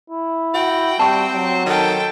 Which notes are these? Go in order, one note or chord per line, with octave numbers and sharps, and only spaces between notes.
E4
F#4 G5
G3 C4 A5 C#6
F#3
D#3 A4 G5